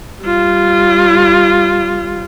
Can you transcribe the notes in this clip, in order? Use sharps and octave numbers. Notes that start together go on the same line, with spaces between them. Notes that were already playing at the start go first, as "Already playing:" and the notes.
G3 F4